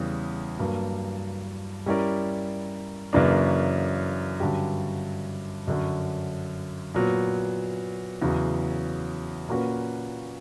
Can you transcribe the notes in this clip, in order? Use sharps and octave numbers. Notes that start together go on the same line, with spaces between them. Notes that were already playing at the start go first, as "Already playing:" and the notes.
Already playing: E2 C#3 G3
G2 F#3 A#3
G3 C#4 E4 A#4 D5
F#2 C#3 E3 A#3 D4
G2 D3 F#3 C#4 G4
F#2 D3 F#3 C#4
A#2 F#3 B3
E2 C#3 F#3
A#2 A#3 C#4 F#4 B4